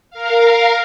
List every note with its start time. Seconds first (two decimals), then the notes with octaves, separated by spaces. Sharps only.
0.10 A#4 F5